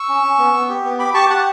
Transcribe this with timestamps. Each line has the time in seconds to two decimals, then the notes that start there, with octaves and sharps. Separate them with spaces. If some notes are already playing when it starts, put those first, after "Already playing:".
Already playing: C#6 E6
0.09 C#4
0.24 C#4
0.38 B3
0.53 B3
0.69 G4
0.84 B3
0.99 G4 B5 D6
1.14 G4 A5 C#6
1.30 G4 F#5 A5